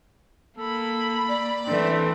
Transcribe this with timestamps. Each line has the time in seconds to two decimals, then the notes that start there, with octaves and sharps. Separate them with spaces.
0.58 A#3 A4 B5
1.28 D5
1.66 E3 A3 C4 D4